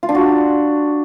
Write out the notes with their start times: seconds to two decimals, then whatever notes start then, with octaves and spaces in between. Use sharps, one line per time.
0.03 F4
0.09 D4
0.15 F#4